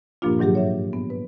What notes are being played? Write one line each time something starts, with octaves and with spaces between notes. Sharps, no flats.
G2 A#2 F3 A#3 D4 F4
G#2 D#3 F#3 G4 G#4
C#5 E5
B3
B4